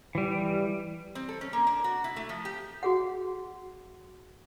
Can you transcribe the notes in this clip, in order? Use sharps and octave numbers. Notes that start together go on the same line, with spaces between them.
E3 G3
C4
A4
C#4
A#3
D4
F#4
E4
A3
F3
G4
F#4 G#4 F#5